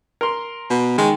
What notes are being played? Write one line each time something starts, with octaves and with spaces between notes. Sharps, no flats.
A#4 C6
B2
D#3 G#3